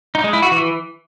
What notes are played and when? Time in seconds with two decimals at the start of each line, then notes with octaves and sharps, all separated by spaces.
0.15 D#4
0.24 G#3
0.33 E4
0.42 F#4
0.52 E3